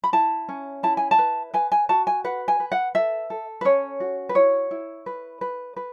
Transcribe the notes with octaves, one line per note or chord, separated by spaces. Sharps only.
B5
E4 A5
C#4
E4 A5
G#5
A5
B4
B4 G#5
G#5
F#4 A5
G#5
B4 F#5
G#5
B4
F#5
A4 E5
A4
B4
C#4 C#5
F#4
B4
E4 C#5
E4
B4
B4
B4